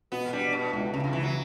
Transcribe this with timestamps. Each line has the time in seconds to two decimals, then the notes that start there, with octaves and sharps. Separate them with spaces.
0.12 B2 B3
0.33 G3 D4
0.52 B2 D4
0.73 C#2 A2
0.93 G2 C#3
1.04 G2
1.13 C#3 E3
1.23 F#3